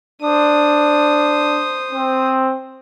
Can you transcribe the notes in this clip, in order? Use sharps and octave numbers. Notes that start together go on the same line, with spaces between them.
D4 C5 D#6
C4